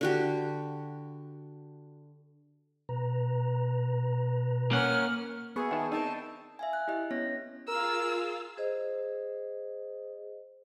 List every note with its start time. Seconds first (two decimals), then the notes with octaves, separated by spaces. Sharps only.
0.01 D3 F#4 G4
2.89 B2 B4 A#5
4.71 A#3 C#4 F#5 F6
5.56 B3 F#4 G#4 E5 C#6
5.71 D#3 A5
5.92 C4 D#4 A#4 A5
6.06 D4
6.59 E5 F5 G#5
6.73 F#6
6.88 E4 G4 D#5 F#6
7.11 B3 C#4 C#5 A#6
7.68 F4 G#4 A#4 F5 E6
8.57 G#4 C5 D#5